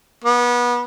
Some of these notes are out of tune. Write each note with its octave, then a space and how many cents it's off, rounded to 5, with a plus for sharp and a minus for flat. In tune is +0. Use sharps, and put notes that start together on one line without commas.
B3 -25